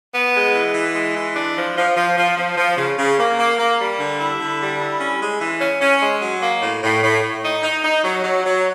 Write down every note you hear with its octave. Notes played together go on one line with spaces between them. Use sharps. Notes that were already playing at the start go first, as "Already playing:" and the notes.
B3
G#3
E3
E3
G#3
E3
D4
F3
F3
F3
F3
F3
F3
C#3
C#3
A#3
A#3
A#3
G3
D3
E4
D3
G3
E4
C#4
G#3
E3
C#4
C#4
G#3
F#3
A#3
A2
A2
A2
A2
D#4
D#4
D#4
F#3
F#3
F#3